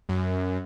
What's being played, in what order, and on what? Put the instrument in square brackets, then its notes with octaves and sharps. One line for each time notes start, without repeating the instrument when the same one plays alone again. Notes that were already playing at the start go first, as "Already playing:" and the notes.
[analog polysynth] F#2